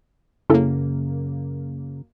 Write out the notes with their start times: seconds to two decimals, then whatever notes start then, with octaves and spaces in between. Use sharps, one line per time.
0.50 F#2 C#3 A#3 C#4 E4 A4